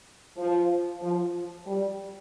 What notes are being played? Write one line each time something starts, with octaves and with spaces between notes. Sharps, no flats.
F3
F3
G3